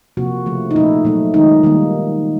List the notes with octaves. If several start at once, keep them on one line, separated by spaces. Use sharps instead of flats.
C3 F3 A#3 F#4
C#3 F3 A3
D#4
A#2 F3 A3 E4
A#2 F#3 A3
D#3 G#3 D#4
D#3 G3 A#3